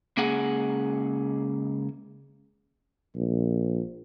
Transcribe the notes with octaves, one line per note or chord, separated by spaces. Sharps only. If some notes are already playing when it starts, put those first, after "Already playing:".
C#2 A#3 C#4 G#4 F#5
A#1